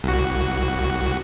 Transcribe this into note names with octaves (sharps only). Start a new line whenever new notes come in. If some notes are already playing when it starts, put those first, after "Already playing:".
C2 F#4